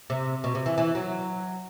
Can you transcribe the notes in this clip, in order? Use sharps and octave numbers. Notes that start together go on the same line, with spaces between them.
C3
B2
C3
E3
E3
F#3